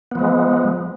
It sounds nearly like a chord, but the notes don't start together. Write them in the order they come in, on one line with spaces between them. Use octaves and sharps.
B3 F3 G#3